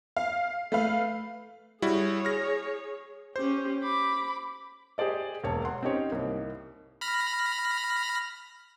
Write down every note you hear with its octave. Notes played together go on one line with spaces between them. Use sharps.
F5
A3 B4 F5
G3 E4 F#4 G#4 C#5
F6 A#6
C#4 G4 C5
B5 D6
G4 G#4 C5 D5 D#5
E1 A#3 C#5 A5
F#5 C6
C4 C#4 D#4 G4 C#5
C2 A#3 D#4
B5 F6 A#6